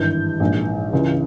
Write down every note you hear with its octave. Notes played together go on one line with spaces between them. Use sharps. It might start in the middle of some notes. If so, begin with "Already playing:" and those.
Already playing: G#1 G2 E3 G6
A#1 G#2 E3
C#2 C#3 E3